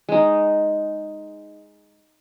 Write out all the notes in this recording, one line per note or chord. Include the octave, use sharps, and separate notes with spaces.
G#3 D#4